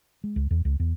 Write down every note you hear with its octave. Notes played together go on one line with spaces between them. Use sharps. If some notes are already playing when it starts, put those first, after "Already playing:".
G#3
C#2
E2
C#2
E2